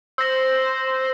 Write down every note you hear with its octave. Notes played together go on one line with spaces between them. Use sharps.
C5 E6 A#6